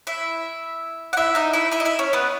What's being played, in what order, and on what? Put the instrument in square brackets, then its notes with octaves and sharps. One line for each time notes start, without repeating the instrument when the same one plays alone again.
[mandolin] E4 E5
F#5
E4 E5
D#4 D#5
E4 E5
E4 E5
D#5
E4 E5
C#4 C#5
B3 B4